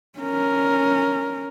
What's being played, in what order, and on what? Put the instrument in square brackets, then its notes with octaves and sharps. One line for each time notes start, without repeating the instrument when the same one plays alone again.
[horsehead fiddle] C#4 A#4